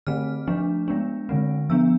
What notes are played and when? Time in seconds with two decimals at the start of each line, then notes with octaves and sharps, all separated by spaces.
0.07 D3 A3 C4 F6
0.47 F3 A3 D4
0.88 G#3 B3 D4
1.29 D3 G#3 C4
1.70 F3 B3 D4 E6